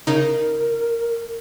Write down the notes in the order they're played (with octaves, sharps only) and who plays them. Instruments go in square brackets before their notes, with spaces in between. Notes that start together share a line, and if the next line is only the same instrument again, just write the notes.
[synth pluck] C#3 D#4 [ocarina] A#4